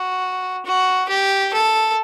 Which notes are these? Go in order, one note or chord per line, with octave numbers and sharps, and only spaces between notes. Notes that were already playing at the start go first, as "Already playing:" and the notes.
Already playing: F#4
F#4
G4
A4